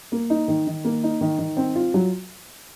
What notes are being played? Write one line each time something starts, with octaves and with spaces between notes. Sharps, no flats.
A#3
D#4
D#3
D#3
A#3
D#4
D#3
D#3
C4
F4
F#3